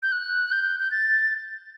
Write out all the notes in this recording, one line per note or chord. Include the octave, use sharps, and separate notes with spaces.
G6
F#6
G6
G6
A6